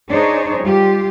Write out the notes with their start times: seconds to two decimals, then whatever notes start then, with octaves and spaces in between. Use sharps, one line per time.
0.10 D4 D#4 G#4 C5 C#5
0.63 G3 F4 G4